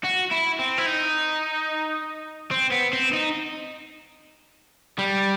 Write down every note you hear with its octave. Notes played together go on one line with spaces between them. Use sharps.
F#4
E4
C4
E4
D#4
C4
B3
C4
D#4
G3